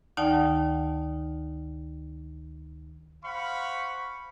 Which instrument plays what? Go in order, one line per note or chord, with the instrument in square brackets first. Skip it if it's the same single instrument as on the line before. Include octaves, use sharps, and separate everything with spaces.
[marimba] D2 D#3 D#4 D5 G5 A5
[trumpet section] C5 F5 F#5 B5 C#6